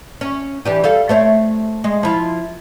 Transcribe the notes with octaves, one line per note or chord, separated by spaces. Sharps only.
C#4
E3 D4 G4
G3 A4 F5
A3 C4 C#5
G#3
F3 E4 F4